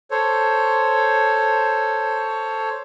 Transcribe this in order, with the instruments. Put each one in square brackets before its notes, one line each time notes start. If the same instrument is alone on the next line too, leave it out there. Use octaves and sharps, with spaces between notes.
[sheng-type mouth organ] A4 C5 C#5